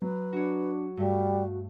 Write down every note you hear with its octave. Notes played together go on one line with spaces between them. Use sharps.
F#3 B4
D4 F#4 C#5
G2 G3 A3 F#4